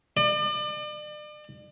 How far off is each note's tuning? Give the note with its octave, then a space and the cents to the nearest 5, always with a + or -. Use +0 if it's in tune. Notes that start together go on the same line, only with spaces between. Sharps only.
D5 +40